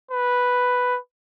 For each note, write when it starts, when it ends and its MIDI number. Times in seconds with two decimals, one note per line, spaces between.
0.11 0.98 71